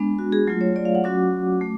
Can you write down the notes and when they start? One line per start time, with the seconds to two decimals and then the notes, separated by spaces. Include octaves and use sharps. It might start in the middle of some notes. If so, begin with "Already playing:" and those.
Already playing: G#3 B3 D4
0.19 F#4
0.32 G#4
0.47 F#3 A3 F4
0.61 C#5
0.76 D5
0.85 F5
0.95 F#5
1.04 F#3 C#4 F#4 D6
1.61 A3